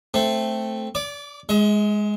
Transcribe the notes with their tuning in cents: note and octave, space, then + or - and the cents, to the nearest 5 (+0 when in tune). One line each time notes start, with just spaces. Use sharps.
A3 +0 C4 +0
D5 -30 D6 +10
G#3 +0 D#5 +40